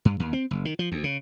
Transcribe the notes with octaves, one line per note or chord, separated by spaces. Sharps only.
G2
D#2
C4
F#1
D#3
F3
D2
C#3